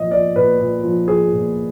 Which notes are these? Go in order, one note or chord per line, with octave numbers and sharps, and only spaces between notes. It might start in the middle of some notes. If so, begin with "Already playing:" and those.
Already playing: A#2 F3 D#5
F3 D5
A#2 B4
A#2
F3
F3 G#4
A#2